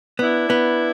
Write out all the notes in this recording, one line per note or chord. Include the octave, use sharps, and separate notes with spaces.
B3 D4 E4
B3